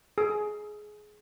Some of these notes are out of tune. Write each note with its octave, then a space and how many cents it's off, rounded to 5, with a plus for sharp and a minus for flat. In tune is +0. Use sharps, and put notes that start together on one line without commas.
G#4 +15